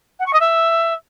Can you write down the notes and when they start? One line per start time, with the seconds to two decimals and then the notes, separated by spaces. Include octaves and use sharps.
0.19 F#5
0.26 C#6
0.33 D#5
0.40 E5